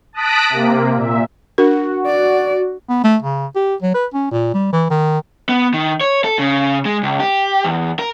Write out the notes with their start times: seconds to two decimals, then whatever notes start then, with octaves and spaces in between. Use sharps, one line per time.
0.13 A5 D#6 F#6 A#6 B6 D7
0.50 C3 A#3
0.96 A#2 E5
1.58 D4 F#4 A#4
2.06 D5
2.89 B3
3.04 A3
3.22 C#3
3.56 G4
3.82 F#3
3.94 B4
4.14 C#4
4.31 A#2
4.54 G3
4.73 E3
4.90 D#3
5.49 B3
5.74 D#3
6.01 C#5
6.24 A4
6.39 C#3
6.85 G#3
7.03 C#2
7.20 G4
7.64 E2
7.99 A#4